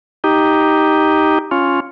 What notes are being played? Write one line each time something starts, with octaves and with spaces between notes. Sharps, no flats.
D#4 G4
C#4 F4